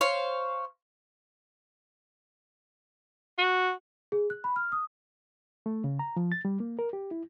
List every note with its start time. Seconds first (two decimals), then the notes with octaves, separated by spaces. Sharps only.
0.01 C5 C#5 F5
3.39 F#4
4.12 G#4
4.30 F#6
4.44 B5
4.56 F6
4.72 D#6
5.66 A3
5.84 C#3
5.99 A#5
6.16 F3
6.32 A6
6.45 G3
6.60 A#3
6.79 A#4
6.93 G4
7.11 E4